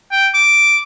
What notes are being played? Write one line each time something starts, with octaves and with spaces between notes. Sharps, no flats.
G5
D6